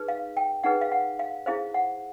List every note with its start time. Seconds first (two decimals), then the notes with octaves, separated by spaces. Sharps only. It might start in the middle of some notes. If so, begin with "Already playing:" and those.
Already playing: D#4 G#4 B4
0.08 F5
0.37 G5
0.64 D#4 G#4 B4 F#5
0.81 F5
0.92 F#5
1.19 F5
1.46 E4 G#4 C5 F5
1.74 F#5